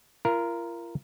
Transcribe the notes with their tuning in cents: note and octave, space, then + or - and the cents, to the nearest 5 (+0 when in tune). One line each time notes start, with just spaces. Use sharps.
F4 -40 A#4 +0